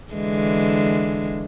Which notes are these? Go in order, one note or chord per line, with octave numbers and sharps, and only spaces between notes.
D3 E3 G#3